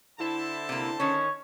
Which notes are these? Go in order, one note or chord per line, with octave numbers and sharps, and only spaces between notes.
D3 E4 C5 A5
C3 A#3
D#3 C#4 C#5